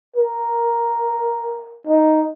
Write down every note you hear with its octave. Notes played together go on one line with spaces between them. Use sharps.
A#4
D#4